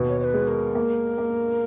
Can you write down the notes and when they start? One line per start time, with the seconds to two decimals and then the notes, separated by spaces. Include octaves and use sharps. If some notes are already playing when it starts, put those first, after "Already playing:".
Already playing: D#2 B2
0.09 C#5
0.20 C#5
0.24 B4
0.34 G#3
0.48 A#4
0.75 A#3
1.18 A#3